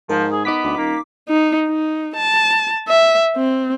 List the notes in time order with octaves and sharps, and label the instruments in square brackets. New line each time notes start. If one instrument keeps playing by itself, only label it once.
[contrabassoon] G#2 [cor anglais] F3 [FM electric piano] A#4
[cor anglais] G#4
[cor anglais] B3 [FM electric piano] D#4 D6 B6
[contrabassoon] D2
[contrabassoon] D#1 [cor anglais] A#3
[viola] D#4
D#4
A5
E5
C4